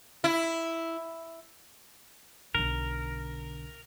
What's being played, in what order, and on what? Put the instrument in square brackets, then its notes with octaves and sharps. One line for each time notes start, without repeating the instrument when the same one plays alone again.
[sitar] E4
[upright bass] B1 D3 [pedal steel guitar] A#4